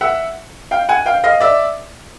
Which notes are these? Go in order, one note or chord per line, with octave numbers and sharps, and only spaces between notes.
E5 F#5
F5 G5
F#5 G#5
F5 G5
D#5 F5
D5 E5